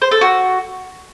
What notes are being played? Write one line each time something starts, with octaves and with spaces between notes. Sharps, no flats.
C5
A4
F#4